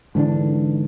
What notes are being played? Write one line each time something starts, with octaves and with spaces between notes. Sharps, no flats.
G#2 D3 E3 D4